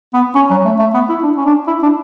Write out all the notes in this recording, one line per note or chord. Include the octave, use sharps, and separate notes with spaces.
B3
C#4
F#3
A3
A3
B3
E4
D4
C#4
D4
E4
D4